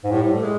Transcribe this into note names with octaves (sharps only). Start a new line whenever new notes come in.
G#2
A2 G3
A3
G#3